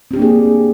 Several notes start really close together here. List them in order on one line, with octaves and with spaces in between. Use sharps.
C4 G4 D4 A#3 G#4